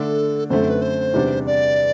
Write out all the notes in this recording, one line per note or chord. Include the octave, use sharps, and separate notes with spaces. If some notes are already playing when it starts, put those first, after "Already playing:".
Already playing: D3 A3 D4 A4
F#2 D3 A3 C4 C5
B4
C5
E2 C3 G3 D4
D5